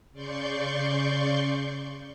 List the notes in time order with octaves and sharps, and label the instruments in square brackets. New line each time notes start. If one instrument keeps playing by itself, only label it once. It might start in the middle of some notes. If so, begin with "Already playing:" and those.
[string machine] C#3 D5 C6 C#6 G6